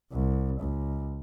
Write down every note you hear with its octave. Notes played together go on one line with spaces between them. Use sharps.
C2
C#2